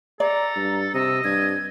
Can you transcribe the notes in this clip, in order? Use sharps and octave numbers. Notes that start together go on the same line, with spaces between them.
A4 D5 A#5
G2
C3 D#5 E6
G2 G#6